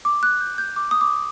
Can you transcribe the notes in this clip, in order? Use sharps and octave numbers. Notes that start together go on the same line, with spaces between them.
D6
F#6
G6
G6
D6
D#6
D6